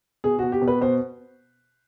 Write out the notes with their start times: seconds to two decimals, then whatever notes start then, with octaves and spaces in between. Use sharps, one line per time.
0.24 B2 G#4
0.39 B2 F#4
0.52 G4
0.62 B2
0.68 B4
0.81 B2 C5